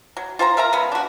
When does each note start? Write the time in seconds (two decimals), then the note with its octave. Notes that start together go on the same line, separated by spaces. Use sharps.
0.17 F#3
0.39 F4 C5 G#5 A#5
0.57 A#4 E5 F5 A#5
0.73 C#3 G#3 B3
0.92 D4 F#4